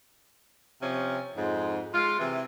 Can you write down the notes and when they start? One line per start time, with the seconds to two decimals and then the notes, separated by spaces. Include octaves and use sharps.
0.81 C3 F3 C#4
1.36 F2 G#2
1.94 G#3 F4
2.19 C3 E3